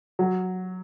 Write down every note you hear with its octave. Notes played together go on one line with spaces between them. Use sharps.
F#3